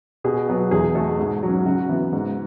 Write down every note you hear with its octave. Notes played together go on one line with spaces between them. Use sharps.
B2 G#4
F#3 B3
E2 G#4
B2 A3 A4
G#2
F#3 C#4
C#3 F#4
E3 B3
G#2